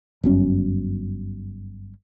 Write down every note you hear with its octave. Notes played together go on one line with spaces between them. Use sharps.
G1 F#2 C#4